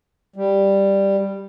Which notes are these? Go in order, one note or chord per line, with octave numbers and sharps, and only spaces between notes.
G3